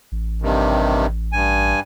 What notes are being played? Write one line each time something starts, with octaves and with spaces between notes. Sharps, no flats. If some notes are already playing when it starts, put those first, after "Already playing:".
A1
G2 C3 D#3
G2 G#5